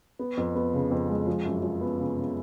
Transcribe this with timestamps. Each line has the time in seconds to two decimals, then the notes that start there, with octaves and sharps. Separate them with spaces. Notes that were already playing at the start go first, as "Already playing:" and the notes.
0.19 B3
0.37 F2
0.55 B3
0.74 C#3
0.91 F2
1.09 G#3
1.27 F3
1.45 F#2
1.63 F3
1.81 B3
1.99 C#3
2.17 C#3